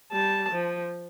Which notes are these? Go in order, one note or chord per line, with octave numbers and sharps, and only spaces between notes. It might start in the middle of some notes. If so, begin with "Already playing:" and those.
G3 A5
F3